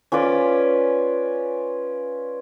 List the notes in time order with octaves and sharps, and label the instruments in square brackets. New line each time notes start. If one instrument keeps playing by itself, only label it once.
[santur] C#4 F4 B4 D5